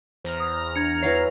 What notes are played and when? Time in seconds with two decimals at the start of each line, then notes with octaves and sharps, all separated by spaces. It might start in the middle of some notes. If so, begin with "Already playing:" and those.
0.25 E2 C5 A#5 F6
0.40 D#6
0.76 D4 G#6 C#7
1.02 E3 F#3 C#5 E5 G#6 C7